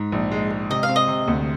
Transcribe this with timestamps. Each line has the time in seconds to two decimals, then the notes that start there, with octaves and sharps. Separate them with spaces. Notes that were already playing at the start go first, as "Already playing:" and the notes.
Already playing: G#2
0.12 A#1
0.32 G#3
0.51 G#3
0.70 C3 D#5
0.83 F5
0.89 C4
0.96 D#5
1.08 C3
1.28 D2